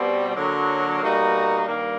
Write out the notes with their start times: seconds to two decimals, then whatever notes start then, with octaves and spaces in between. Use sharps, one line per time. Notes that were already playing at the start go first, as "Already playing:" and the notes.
Already playing: B2 G3 C4
0.35 D3 F#3 A#3
1.01 B2 G3 A#3 D#4 F#4
1.66 G2 D#3 G3 A#3